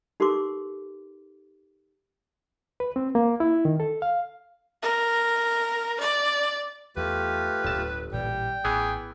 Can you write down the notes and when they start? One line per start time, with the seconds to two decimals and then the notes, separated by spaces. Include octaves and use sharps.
0.20 D#4 G4 A4 A#4 C6 D6
2.80 B4
2.96 C4
3.15 A#3
3.40 E4
3.65 D#3
3.80 A4
4.02 F5
4.83 A#4
6.00 D5
6.97 E2 A3 F4 G4 B4
7.64 D1 G1 A5
8.13 A1 A#2 E3 G3 G5
8.65 A1 E3 B3 G#4